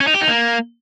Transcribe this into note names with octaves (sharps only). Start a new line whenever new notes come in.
C#4
D#4
G4
D#4
A#3